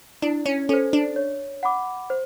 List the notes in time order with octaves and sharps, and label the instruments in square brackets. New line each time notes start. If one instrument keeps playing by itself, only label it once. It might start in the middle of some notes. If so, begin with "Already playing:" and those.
[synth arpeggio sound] D4 [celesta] E4
[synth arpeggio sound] C#4
[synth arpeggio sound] C#4 [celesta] A4 C5
[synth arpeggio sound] D4
[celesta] C#5
F#5 B5 D6
C5